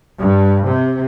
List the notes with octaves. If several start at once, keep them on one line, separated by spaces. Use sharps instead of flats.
G2
C3